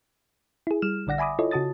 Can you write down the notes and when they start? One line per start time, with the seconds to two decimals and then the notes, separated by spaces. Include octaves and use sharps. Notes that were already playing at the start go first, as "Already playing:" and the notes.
0.67 E4 G#4
0.82 G3 F6 E7
1.07 A#1 D3 D5 F#5 A#6
1.18 E5 G#5 B5 D6 D#6
1.39 E4 F4 A4 C#5 D#5
1.51 C#3 F#4 A5 D#6 A6